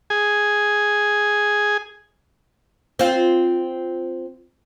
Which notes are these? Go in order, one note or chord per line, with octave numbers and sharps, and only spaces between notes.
G#4 G#5
C4 F4